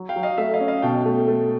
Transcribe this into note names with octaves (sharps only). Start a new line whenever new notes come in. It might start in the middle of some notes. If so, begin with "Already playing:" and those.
Already playing: F#3
F5 G5
F#3
D#5 F5
A3 E5
D#5 F5
C#4
D#5 F5
B2 G5 A5
A3
A3